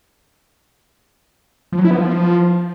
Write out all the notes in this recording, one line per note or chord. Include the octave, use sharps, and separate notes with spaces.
F3
F#3
E4
B3
F3